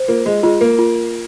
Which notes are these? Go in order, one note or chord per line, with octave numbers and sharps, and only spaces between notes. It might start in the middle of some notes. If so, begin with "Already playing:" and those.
Already playing: C5
A#3 F4
G#3
G#3 F4
A#3
F4